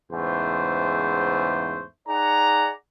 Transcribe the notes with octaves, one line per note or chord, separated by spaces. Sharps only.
E2 G#2 C#3 A3 C5
D#4 G#4 D5 F#5 A#5